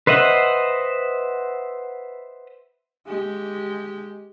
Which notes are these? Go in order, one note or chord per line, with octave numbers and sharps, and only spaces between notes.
B4 C5 D#5 E5 F#5
G#3 G4